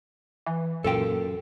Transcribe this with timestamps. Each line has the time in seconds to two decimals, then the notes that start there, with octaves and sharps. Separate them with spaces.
0.46 E3
0.84 F#2 A#2 A4 F5 G5